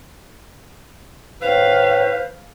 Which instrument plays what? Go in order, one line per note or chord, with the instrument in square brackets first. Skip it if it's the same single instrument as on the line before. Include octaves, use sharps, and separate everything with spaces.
[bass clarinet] A2 [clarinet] B4 [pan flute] C5 [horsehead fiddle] F5